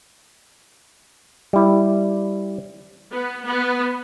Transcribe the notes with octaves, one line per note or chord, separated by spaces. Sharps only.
G3 E4
B3
B3